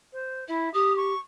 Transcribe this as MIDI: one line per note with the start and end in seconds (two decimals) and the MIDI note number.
0.13 0.45 72
0.48 0.69 64
0.48 0.73 76
0.74 1.13 67
0.74 0.93 87
0.96 1.19 85